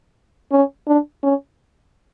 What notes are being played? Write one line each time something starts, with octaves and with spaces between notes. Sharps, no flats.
C#4
D4
C#4